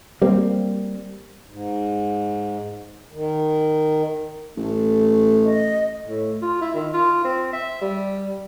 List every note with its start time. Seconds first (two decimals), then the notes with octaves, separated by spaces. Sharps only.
0.22 G3 A#3 C4
1.46 G#2
3.13 D#3
4.57 A1 A3
5.45 D#5
6.07 A2
6.42 F4
6.62 E4
6.74 D#3
6.94 F4
7.24 C4
7.53 E5
7.82 G3